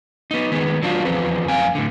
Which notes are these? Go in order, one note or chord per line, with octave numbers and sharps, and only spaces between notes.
B3 D#4
D#3 G#3 B3
F#3 D4 F4
E2 F3 C4 B4
F#2 F5 G#5
A2 D3